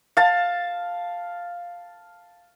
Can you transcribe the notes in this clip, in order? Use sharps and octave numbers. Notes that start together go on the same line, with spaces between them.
F5 A5